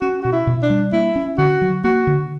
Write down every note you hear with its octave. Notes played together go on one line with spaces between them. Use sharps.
C#4 F#4
B2 F#4
E4
B2
D4
G3
A#3 E4
C#4
D3 F#4
F#3
A#3 F#4
D3